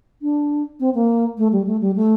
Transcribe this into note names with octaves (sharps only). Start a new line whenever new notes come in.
D4
C4
A#3
A3
G3
A3
G3
A3